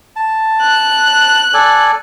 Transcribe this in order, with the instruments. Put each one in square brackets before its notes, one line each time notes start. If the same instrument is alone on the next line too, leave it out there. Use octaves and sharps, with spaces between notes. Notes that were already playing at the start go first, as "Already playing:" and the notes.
[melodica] A5
[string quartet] F#6
[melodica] A4 D5 G#5